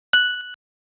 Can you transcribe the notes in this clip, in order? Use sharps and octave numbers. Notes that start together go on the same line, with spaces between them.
F#6